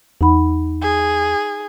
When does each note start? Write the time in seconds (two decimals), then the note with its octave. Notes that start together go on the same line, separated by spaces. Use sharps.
0.21 E2 D#4 F#5 B5
0.82 G#4